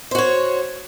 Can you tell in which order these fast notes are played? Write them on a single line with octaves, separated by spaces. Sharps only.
C5 F#4 C#5